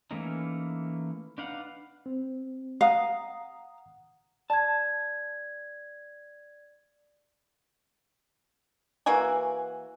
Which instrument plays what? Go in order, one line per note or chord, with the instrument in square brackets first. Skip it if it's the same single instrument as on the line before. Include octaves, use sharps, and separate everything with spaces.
[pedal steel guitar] E3 A3 A#3 C#4 D#4
D4 D#4 B4 F5 F#5
[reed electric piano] C4
[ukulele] F5 [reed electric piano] F#5 A#5 D#6
[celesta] D5 G#6 [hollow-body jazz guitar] A5
[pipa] E3 A#3 F#4 G#5